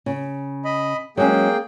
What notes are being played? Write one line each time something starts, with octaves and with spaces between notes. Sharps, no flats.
C#3
D#5 B5
F#3 G#3 A#3 C#4 G#4 G5